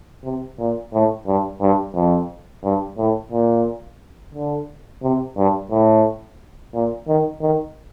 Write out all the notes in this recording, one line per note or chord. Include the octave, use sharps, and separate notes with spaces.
C3
A#2
A2
G2
G2
F2
G2
A2
A#2
D3
C3
G2
A2
A#2
D#3
D#3